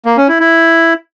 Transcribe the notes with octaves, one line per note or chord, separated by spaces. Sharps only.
A#3
C#4
E4
E4